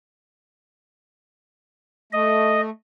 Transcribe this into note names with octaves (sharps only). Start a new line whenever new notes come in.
A3 D#5